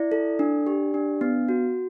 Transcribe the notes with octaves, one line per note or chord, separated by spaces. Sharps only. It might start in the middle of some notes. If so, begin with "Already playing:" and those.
Already playing: E4 D5
A4
D4
G4
D4
B3
F#4